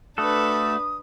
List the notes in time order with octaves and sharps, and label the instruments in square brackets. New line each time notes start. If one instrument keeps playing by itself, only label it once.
[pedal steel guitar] A3 F#4 A4 [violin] D4 B4 [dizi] D#6